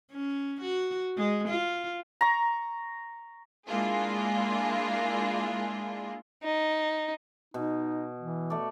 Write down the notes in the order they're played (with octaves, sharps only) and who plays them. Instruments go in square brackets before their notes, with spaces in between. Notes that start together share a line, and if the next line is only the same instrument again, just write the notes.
[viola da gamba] C#4
F#4
G#3
F4
[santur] A#5 C#6
[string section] G#3 A#3 D4 E4 F4 G#4
[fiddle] D#4
[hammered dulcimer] B2 [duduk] D#4
[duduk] E3
[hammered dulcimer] A3 D5